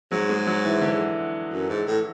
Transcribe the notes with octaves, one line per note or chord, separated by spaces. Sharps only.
G#2 F#3
G#3
F#3
E3
D3
F#2
G#2
A2